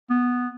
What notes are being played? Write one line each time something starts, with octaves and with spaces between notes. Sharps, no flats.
B3